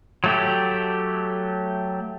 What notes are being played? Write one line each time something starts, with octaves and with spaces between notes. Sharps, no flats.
F#3 A3 G4